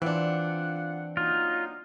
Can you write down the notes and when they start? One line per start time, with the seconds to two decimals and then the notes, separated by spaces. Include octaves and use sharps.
0.02 E3 C4 D4 F4 F#5
1.17 F#3 A#3 D#4 F4